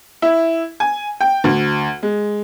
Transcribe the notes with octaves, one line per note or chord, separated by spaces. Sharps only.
E4
G#5
G5
D2
G#3